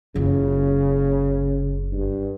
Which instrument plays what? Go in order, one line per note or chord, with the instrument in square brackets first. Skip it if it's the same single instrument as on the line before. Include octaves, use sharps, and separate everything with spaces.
[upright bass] F#1 F4 [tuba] C#3
[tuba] G2